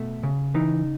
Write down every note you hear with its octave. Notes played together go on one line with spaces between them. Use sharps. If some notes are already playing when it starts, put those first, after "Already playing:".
Already playing: B2 A3
C#3
E3 D#4